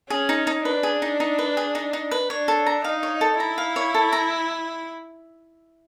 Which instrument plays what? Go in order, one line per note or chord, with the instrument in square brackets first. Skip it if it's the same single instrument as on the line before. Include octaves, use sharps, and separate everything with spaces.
[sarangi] C#4 [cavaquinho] G#4
[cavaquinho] D#4
D#4
[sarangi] D4 [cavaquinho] B4
[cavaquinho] G#4
D#4
D#4
B4
G#4
D#4
D#4
B4
[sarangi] D4 [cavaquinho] C#5
[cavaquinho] A4
A#5
[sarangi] D#4 [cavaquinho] F5
[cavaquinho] C#5
A4
[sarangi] E4 [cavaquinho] A#5
[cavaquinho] F5
C#5
A4
A#5